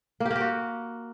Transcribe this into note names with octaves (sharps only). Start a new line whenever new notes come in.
A#3
G4
A#3
G4
F#4